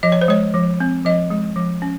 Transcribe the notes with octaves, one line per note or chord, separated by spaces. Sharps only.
F3 D#5
C#5
C5
G#3 C#5
F3
C4
F3 D#5
G#3
F3
C#4